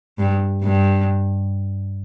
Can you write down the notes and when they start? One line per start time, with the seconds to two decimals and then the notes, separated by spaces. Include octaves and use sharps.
0.18 G2
0.63 G2